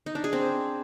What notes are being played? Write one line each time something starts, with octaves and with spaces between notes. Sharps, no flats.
D#4
D4
G#4
C4